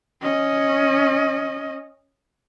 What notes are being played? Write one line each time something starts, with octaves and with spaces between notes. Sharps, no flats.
C#4 D#5